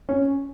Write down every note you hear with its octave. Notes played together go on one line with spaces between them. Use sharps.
C#4